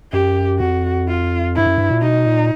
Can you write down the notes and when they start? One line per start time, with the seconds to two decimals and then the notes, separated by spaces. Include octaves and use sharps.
0.13 F#2 G4
0.60 F2 F#4
1.08 F4
1.55 G2 E4
1.66 F#2
1.78 G2
1.90 A#2
2.02 B2 D#4
2.26 A#2